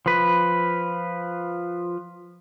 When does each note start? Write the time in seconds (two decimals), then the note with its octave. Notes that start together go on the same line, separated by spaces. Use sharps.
0.06 F3 B4